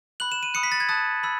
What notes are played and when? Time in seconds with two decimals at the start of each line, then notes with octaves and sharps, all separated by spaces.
0.20 B5 F#6 F#7
0.32 E7
0.43 D#7
0.54 B5 D#6 F#6 C#7
0.63 B6
0.72 A6
0.80 G#6
0.89 A5 D#6 F#6 A6
1.23 B5 E6